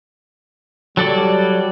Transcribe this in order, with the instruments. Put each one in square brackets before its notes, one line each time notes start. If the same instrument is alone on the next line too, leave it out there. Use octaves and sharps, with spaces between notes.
[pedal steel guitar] F#3 A4 D5 [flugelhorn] G3